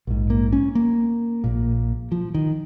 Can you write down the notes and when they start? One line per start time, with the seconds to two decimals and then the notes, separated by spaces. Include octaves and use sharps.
0.07 A#1 G#2
0.30 A#3
0.53 C#4
0.75 A#3
1.44 A#1 A#2
2.12 F3
2.34 D#3